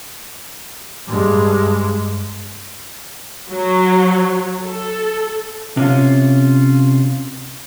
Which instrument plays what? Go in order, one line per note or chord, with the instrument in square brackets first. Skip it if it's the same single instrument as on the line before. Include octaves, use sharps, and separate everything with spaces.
[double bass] G2 G#3
[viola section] F#3
A4
[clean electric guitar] C3 C#4 F4